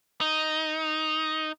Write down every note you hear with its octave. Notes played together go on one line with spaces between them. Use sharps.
D#4